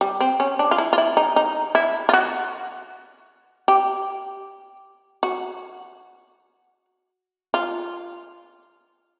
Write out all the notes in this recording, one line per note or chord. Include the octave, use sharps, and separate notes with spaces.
G3
C4
C#4
D4
F4
E4
F4
E4
D#4
D#4
E4
F4
F#4
G4
F#4
F4